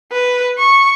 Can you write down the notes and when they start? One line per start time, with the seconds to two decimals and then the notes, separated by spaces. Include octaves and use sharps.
0.12 B4
0.58 C#6